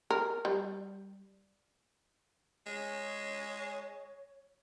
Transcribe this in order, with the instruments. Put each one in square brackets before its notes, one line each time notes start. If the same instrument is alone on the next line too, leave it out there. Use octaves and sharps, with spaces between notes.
[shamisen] A#4
G3
[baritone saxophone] G#3 [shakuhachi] C#5